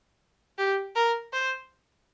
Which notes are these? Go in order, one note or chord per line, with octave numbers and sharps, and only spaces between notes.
G4
A#4
C5